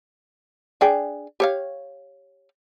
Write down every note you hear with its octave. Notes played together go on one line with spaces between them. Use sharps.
D4 G#4 G5
G4 C#5 F5